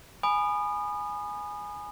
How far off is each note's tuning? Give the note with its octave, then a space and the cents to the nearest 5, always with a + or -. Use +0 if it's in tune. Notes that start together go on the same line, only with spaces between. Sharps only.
G#5 +0 B5 +0 D#6 -30